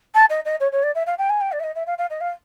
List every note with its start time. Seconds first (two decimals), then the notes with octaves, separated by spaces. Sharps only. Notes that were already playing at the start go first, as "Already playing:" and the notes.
0.15 A5
0.30 D#5
0.45 D#5
0.60 C#5
0.72 C#5
0.83 D5
0.95 E5
1.07 F5
1.18 G5
1.30 G#5
1.41 G5
1.52 D5
1.60 E5
1.64 D#5
1.75 E5
1.87 F5
1.98 F5
2.10 D#5
2.21 F5